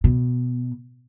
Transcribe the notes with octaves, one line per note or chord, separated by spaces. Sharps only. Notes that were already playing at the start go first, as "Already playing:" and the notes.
B2